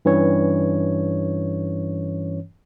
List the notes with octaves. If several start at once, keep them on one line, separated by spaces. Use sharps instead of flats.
G2 E3 C#4 C#5